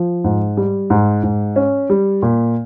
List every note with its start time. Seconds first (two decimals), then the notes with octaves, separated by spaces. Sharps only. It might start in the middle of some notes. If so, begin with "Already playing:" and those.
Already playing: F3
0.24 G#2
0.57 G3
0.90 G#2
1.23 G#2
1.56 C#4
1.90 G3
2.22 A#2